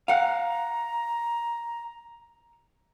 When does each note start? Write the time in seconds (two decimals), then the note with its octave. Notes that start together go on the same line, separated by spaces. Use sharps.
0.08 F5 F#5 A#5